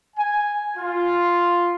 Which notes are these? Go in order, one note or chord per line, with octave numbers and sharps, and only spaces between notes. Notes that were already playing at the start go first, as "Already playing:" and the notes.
G#5
F4